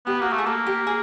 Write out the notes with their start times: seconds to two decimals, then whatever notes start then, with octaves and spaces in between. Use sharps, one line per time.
0.06 B3 G4
0.20 A#3 F#4
0.30 A3 G4
0.38 G#4
0.46 A#3 A4
0.66 G4
0.87 G#4